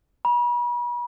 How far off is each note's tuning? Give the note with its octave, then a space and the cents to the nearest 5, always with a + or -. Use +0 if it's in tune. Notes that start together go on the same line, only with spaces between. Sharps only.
B5 -40